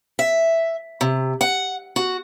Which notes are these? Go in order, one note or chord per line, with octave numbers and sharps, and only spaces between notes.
E5
C3
F#5
F#4